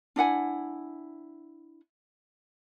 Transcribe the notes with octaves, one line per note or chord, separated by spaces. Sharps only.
D4 E4 F#5 G#5